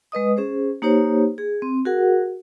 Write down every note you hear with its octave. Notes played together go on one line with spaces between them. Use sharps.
G#3 B4 D#5 D#6
C#4 G#4 C5
A#3 D#4 G4 C5 C#5
G#4
C4
F#4 G#4 A#4 F#5